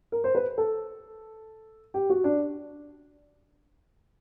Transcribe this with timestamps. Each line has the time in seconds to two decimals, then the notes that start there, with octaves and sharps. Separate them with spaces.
0.12 A#4
0.24 C5
0.35 B4
0.58 A4
1.94 G4
2.10 F#4
2.24 D4